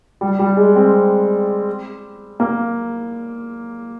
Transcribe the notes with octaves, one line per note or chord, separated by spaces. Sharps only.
G3
G3
G#3
C4
A#3